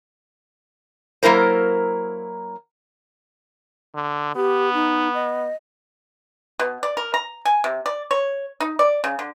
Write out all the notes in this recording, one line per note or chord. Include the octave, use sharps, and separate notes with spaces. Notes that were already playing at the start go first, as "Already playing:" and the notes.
F#3 A#3 E4 A#4 C5
D3
B3 G4
D#4
D#5
B2
D5
A#4
A#5
G#5
C3
D5
C#5
D#4
D5
C#3
D3